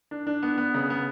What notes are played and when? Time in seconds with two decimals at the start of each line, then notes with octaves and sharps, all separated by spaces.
0.11 D4
0.27 D4
0.43 B3
0.58 B3
0.74 C#3
0.90 B3